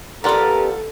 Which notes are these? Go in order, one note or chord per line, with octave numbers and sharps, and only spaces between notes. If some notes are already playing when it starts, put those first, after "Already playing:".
G3 A#3 B3 F4 A4 A#4 D5 F#5